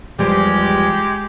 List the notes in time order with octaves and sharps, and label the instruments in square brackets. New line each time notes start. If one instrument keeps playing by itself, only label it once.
[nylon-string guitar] E2 F3 G3 [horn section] G#3 G4